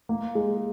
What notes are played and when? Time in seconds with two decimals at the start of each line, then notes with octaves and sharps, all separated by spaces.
0.09 A#3
0.35 G#3